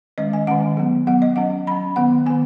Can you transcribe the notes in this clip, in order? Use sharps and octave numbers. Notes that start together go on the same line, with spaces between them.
D#3 G#3 C#4 D#5
G#5
D#3 G#3 C#4 F#5
F#3 B3
F#3 B3 F#5
D#5
F#3 C#4 F#5
F#3 C#4 B5
D#3 B3 F#5
D#3 B3 G#5